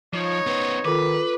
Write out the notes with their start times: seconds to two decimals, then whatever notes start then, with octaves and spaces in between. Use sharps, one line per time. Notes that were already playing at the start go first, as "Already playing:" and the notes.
0.14 F3 D#4 C#5
0.47 B3 C5
0.85 D#3 F4 A4 B4 D6